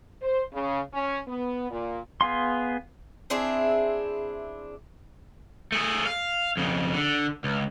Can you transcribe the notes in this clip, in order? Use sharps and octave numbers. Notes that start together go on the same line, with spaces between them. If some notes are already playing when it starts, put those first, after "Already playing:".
C5
C#3
C#4
B3
A#2
B3 G#4 F5 C6
C4 D4 E4 G#4
A3 G#4
F5
F2 C#3
D3
C#2